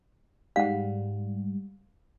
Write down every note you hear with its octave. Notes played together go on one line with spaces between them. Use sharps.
G#2 G3 F5 F#5